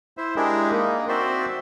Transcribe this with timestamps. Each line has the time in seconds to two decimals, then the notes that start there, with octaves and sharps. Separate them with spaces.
0.17 E4 C5 E5
0.36 G#3 D4 E4 G4 G#4 A#4
0.72 A#3 D#4
1.08 C4 F#4 C5 D5 E5 C6